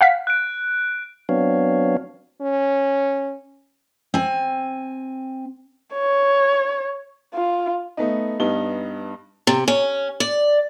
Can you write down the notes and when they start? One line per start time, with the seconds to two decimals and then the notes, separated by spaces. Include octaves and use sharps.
0.01 F5 F#5 B6
0.27 F#6 D7
1.29 F#3 B3 C4 D4 C#5 F5
2.41 C#4
4.14 C4 G#5
5.95 C#5
7.34 F4
7.97 A3 B3 D#4
8.40 G2 G3 B3 D#4 G7
9.47 C3
9.68 C#4
10.20 D5